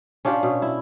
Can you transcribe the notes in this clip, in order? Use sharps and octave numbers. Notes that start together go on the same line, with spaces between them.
C#4 D4 F4 G4
B2
E4